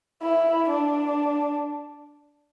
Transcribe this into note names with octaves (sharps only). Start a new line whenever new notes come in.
E4
D4